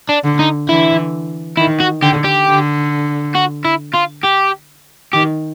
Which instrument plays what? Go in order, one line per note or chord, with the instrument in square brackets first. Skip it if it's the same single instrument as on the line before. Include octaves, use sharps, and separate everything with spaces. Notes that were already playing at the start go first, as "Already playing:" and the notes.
[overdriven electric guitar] D4
[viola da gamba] D3
[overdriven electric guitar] D#4
[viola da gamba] D3 E3 [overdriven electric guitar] E4
[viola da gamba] D#3 [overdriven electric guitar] E4
[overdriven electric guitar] F#4
[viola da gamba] D3 [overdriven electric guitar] G4
[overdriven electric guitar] G4
[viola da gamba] D3
[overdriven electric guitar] F#4
E4
F4
G4
[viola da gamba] D#3 [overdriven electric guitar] G4